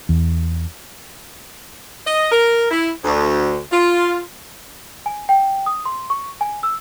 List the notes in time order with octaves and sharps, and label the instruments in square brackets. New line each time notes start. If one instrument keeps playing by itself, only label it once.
[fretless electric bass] E2
[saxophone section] D#5
A#4
E4
D2
F4
[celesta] G#5
G5
D#6
C6
C#6
G#5
E6